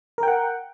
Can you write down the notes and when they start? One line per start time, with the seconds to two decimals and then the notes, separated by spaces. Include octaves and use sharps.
0.18 A#4
0.23 G5
0.28 F#5